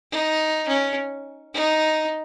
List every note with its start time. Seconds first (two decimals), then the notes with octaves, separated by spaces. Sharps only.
0.12 D#4
0.68 C#4
1.55 D#4